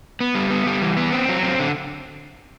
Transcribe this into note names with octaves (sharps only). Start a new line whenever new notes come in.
B3
G3
B3
G3
E3
B3
C4
F#3
C4
D3